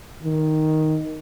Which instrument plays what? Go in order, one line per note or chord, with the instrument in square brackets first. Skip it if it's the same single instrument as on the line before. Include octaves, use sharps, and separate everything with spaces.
[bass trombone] D#3